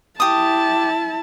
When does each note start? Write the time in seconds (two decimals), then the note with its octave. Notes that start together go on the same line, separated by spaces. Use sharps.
0.20 E4 G4 A5 D#6